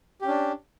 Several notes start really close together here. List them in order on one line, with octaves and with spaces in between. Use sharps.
G4 C#4 D4